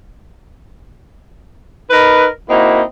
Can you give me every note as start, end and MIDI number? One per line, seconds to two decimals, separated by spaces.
1.90 2.28 63
1.90 2.28 70
1.90 2.28 71
2.49 2.83 58
2.49 2.83 60
2.49 2.83 63
2.49 2.83 64
2.49 2.83 66